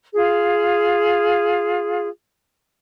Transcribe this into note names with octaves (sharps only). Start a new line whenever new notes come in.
F4 G#4